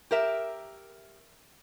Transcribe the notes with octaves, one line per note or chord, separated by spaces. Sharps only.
G4 A#4 E5